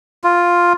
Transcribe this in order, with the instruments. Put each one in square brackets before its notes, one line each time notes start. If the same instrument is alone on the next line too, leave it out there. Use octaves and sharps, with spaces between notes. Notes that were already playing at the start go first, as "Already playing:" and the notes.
[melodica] F4